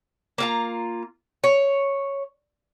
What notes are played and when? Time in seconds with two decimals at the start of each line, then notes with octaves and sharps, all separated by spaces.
0.38 A#3 F4 A#5
1.44 C#5